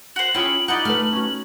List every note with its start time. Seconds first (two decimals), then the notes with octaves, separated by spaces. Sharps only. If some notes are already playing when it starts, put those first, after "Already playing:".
0.16 F#4 C5 F#7
0.34 C#4 E4 F4 G#4 G5 E6
0.68 D#4 E4 G4 D5 D#5 F#5
0.85 A3 A4 B4 F6
1.13 C#4 F#4